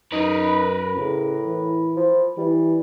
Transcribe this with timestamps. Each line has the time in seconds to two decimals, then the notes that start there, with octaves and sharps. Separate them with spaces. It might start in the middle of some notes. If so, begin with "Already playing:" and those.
0.12 F#2 D#4 A#4 B4
0.97 A2 C#3
1.46 E3
1.96 F3
2.37 E3 G3